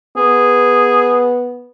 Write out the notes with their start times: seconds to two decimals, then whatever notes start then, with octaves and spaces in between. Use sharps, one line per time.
0.17 B3 G#4